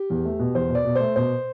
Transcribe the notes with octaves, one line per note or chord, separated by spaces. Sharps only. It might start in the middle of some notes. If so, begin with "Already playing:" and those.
Already playing: G4
E2
A3
B2
E2 C5
B2
D5
B2
A3 C5
B2 C5